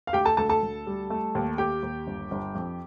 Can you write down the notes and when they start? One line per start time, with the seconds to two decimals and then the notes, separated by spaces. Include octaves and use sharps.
0.07 F5
0.13 D2 G4 G5
0.25 A4 A5
0.37 D2 A4 A5
0.49 A4 A5
0.63 D2
0.87 G3
1.10 A3
1.35 D#2
1.58 D#2 G4 G5
1.83 D#2
2.07 G1
2.31 G1
2.55 F2